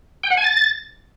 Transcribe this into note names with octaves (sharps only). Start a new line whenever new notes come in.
G5
F#5
G#5
A6